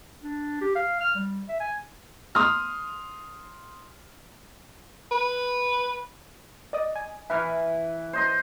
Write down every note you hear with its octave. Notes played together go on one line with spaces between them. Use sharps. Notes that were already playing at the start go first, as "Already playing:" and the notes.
D4
G4
F5
F6
G3
E5
G#5
C6 D#6 F6
B4
D5 D#5 D#6
G#5
E3 B4 E5 F6
C5 D#5 C6